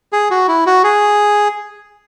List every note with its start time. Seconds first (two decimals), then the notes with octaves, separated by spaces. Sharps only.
0.13 G#4
0.31 F#4
0.48 E4
0.66 F#4
0.84 G#4